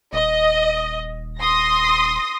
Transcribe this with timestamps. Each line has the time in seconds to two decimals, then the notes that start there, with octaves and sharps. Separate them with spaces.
0.13 D#1 D#5
1.40 C6 D#6 A#6